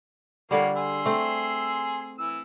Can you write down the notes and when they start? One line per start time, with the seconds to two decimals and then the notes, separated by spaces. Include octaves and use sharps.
0.51 D3 F3 G3 A#3 C#5
0.76 G#4 C6 E6
1.05 A3 C4
2.18 E3 E6